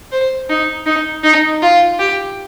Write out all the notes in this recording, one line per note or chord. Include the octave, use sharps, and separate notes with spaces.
C5
D#4
D#4
D#4
F4
G4